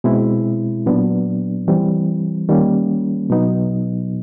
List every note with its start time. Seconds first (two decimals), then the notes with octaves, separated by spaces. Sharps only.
0.04 B2 G#3 C4 E4
0.86 A#2 F#3 B3 D4
1.68 E3 G3 C4
2.49 D#3 G3 A#3 C#4
3.30 B2 F#3 B3 D#4